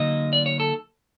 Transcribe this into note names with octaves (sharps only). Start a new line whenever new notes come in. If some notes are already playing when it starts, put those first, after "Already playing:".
Already playing: D3 F#3 A#3 D#4 D#5
D5
C#5
A4